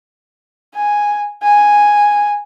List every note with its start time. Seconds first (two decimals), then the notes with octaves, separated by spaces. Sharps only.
0.75 G#5
1.43 G#5